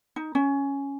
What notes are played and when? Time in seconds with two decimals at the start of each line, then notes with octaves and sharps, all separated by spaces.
0.16 D#4
0.35 C#4